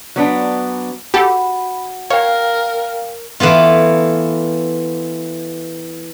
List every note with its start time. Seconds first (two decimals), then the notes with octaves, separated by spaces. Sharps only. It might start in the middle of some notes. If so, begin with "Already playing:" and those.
0.16 F#3 B3 D4
1.14 F#4 G4 A4 B5
2.10 A#4 C#5 F5 G5
3.40 E3 A3 B3 F4